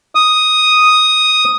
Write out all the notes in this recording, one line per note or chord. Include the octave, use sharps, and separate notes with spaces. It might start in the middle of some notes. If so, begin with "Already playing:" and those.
D#6